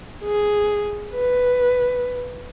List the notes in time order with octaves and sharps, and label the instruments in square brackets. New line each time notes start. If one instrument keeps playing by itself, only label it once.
[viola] G#4
B4